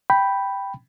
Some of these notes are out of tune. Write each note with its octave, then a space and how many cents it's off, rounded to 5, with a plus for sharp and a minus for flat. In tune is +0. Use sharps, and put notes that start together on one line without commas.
G5 +0 B5 +0